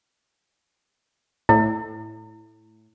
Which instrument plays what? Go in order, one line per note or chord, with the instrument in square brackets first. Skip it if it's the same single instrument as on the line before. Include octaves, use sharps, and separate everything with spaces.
[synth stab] A2 [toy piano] E4